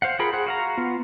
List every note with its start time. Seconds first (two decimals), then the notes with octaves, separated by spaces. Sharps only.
0.02 C5 F5 F#5
0.19 F4 G#4 A#4 G5 B5
0.33 G#4 C5 F#5
0.46 F#4 F5 A#5
0.77 B3 F4